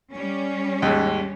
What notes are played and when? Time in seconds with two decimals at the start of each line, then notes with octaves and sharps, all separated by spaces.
0.14 G3 C#4
0.82 D#2 G#2